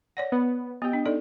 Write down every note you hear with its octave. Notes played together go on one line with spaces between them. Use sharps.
C#5 D5 F#5 A#6
B3
B3 G4 D#5 G5
D4
D#4 A4 D5